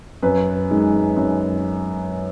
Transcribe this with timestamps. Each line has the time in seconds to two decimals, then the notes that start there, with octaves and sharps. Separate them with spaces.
0.23 F#2 B4
0.70 D#3 G#3
1.17 F#2